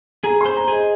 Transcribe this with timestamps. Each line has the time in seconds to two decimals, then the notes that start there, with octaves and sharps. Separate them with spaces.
0.24 G#4 A#5
0.41 C5 C6
0.57 A#5
0.68 G#4 D#5